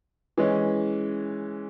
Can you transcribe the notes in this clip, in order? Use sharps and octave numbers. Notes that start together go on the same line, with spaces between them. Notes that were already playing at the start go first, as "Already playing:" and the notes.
E3 G#3 C#4